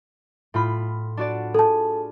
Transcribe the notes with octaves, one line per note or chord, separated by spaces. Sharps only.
A2 F4 B5
D4 F#4 D5
G#4 A4 A5